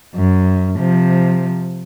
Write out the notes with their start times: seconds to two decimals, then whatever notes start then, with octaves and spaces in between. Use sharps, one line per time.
0.15 F#2
0.78 C3 F3